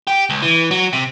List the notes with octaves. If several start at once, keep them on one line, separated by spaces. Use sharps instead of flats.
G4
C#2
E3
F#3
C3